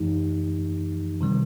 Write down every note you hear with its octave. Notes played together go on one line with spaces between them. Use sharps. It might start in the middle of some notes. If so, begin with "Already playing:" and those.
Already playing: F#2 E3 A3 D#4 G4
C3 D#3 G3